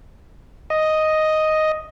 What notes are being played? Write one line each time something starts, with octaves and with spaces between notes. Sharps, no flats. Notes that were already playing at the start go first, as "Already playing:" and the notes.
D#5